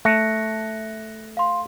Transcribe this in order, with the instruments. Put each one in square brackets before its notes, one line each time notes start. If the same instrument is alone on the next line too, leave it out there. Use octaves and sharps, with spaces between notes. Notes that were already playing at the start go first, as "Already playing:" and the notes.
[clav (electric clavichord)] A3 [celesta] F#6 A#6 C#7
[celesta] F5 C6